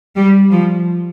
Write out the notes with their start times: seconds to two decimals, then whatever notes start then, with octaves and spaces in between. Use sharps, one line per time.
0.16 G3
0.52 F3